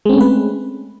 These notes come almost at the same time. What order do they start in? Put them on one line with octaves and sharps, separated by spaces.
G#3 C4 C#4 A3 B4